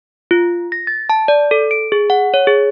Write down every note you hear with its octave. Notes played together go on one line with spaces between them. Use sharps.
F4
A#6
A6
A5
D5
A4
D7
G#4
F#5
C#5
G#4